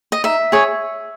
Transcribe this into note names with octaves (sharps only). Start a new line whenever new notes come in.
D#5
D#4 E5
G#4 C#5